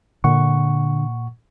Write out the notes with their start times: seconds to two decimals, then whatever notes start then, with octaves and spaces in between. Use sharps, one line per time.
0.24 A#2 D3 F#5 C#6